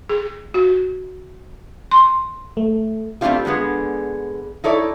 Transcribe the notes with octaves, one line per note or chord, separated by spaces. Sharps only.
G#4
F#4
C6
A3
G3 A3 C4 D4 F4 G4
D3 G#3 B3 G#4
D#4 E4 A4 C#5 D5